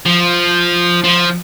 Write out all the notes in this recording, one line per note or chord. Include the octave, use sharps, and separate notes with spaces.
F3
F3